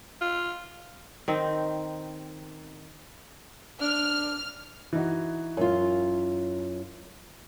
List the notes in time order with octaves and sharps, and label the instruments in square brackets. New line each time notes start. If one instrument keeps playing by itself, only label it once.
[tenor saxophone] F4
[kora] D#3 C4
[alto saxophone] D4 [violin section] F6
[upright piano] E3 D#4 F#4
[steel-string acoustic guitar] F#2 F4